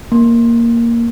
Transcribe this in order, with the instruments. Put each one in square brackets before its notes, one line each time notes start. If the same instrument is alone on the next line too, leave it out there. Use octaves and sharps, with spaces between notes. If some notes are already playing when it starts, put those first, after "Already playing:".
[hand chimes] A#3